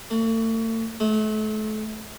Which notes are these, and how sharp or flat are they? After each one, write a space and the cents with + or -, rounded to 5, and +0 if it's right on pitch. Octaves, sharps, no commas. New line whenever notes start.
A3 +40
A3 -35